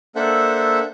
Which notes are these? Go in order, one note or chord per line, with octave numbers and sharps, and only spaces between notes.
A#3 D4 A4 C5 E5 F#5